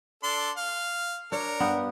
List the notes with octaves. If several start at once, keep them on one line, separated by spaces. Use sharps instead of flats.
D4 A4 C6
F5
D4 A#4 C#5
G2 B3 G4